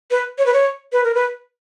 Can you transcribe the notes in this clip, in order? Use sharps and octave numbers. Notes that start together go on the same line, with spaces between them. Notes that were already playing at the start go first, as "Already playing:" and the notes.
B4
C#5
B4
C#5
B4
A#4
B4